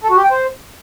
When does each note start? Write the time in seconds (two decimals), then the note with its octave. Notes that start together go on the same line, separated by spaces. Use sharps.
0.03 A4
0.10 F#4
0.17 G4
0.24 G5
0.31 C5